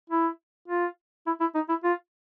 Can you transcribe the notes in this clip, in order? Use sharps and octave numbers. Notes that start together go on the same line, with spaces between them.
E4
F4
E4
E4
D#4
E4
F4